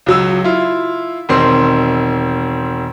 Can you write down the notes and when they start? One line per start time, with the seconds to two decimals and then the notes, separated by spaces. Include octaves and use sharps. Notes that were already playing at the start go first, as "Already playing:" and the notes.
0.06 C#2 F#3 E6
0.44 E4 F4
1.29 E1 D#3 C4 C6